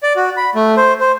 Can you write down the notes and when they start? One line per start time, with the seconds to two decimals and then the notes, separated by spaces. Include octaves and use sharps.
0.03 D5
0.16 F#4
0.37 B5
0.55 A3
0.77 C5
1.01 C5